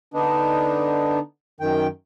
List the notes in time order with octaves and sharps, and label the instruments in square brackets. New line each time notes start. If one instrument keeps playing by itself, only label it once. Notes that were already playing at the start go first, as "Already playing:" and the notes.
[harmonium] D3 B3 D4 D#4
F#2 D#3 G5